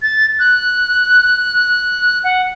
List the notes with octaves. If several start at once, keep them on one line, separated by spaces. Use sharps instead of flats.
A6
F#6
F#5